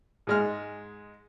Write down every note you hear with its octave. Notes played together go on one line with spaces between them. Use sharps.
G#2 G#3 F6